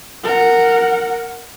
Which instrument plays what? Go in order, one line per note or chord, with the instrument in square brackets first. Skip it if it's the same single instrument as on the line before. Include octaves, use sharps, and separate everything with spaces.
[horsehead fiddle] A#4 F#5